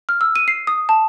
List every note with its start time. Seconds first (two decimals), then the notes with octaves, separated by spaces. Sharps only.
0.09 F6
0.21 E6
0.36 D#7
0.48 C7
0.67 D#6
0.89 A5